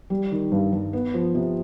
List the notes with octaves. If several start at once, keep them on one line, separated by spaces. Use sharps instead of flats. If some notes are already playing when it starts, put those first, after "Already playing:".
G3
D#3
G2
G2
B3
F3
C3